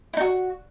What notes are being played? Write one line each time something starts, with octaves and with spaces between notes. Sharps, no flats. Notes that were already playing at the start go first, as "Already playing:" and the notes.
D#4 E4 F#4